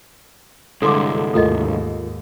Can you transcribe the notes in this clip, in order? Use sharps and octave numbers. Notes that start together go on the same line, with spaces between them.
C2 G2 D3 G#3 A4 C6 D6
D#2 G#2 A3 F4 A4 A#4 D#5